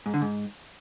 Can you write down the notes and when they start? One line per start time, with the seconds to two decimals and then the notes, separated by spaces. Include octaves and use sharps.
0.06 G#2
0.14 D3
0.22 G#2